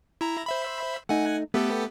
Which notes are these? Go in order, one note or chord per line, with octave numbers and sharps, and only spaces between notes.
E4 A#5
C5 E5 B5
A3 D#4 F#5 G#5
A3 B3 G4 A4